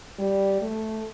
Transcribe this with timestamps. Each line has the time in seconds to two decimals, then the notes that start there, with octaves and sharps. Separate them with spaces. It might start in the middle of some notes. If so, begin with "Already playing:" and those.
0.18 G3
0.62 A3